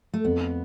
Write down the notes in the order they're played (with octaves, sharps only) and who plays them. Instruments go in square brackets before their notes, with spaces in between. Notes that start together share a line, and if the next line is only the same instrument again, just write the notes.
[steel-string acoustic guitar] A3
[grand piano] F2 [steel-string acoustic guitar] B3